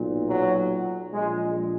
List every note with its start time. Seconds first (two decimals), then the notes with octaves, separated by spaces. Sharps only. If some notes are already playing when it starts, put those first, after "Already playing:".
Already playing: B1 A#2
0.28 F#3
1.13 A#1 A#2 G#3